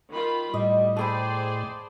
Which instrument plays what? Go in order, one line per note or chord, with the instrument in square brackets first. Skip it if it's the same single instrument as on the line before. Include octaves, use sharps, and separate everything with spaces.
[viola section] D#3 F4 B5
[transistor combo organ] A2 [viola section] G3 [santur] D#5
[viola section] G#4 C5 D5 [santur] A4 G5 B5